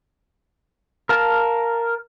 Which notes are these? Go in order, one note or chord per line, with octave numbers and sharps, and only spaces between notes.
A#4 F5 A5